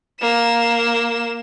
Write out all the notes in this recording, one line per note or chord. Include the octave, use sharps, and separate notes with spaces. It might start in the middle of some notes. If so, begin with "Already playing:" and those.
A#3 E7